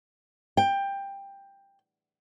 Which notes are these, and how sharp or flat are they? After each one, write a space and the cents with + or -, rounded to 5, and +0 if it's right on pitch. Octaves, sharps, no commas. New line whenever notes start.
G5 +15